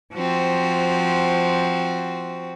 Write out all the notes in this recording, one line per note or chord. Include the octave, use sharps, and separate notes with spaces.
F3 C4 F#4